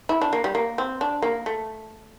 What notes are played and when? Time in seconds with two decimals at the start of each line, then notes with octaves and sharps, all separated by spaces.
0.09 E4
0.22 D4
0.33 A#3
0.44 G3
0.55 A#3
0.78 C4
1.01 D4
1.22 A#3
1.46 A3